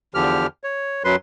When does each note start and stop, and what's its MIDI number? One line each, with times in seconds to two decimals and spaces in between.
0.14 0.47 40
0.14 0.47 50
0.14 0.47 53
0.14 0.47 67
0.14 0.47 89
0.64 1.03 73
1.04 1.16 42
1.04 1.16 54
1.04 1.16 71
1.04 1.16 84